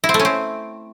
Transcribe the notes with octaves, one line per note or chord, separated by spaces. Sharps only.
E4
C4
A3
C#4
C4